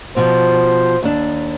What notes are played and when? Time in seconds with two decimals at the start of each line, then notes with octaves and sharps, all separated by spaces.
0.16 B2 F3 C5
1.03 D#2 D4